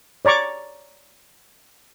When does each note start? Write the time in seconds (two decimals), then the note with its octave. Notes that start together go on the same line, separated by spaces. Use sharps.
0.25 C#5 D5 A#5 C#6 D6